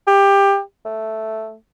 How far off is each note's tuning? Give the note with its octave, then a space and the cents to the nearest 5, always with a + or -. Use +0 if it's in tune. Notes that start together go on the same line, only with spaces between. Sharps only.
G4 +20
A3 +0